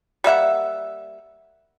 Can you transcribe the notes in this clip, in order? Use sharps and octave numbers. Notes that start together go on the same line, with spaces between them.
G3 A#3 E5 F#5